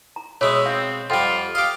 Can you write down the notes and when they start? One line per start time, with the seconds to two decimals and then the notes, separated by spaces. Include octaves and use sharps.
0.16 A#5
0.41 B2 G#3 C#5 E5 D#6
0.66 C4 F5
1.10 F2 G3 F4 F#5 G5 C6
1.55 G4 D#5 F5